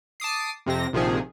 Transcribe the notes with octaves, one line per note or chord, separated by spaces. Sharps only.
A5 D6 D#6 C7
F2 C3 C4 A#6
A#1 C3 D#3 F3 G#4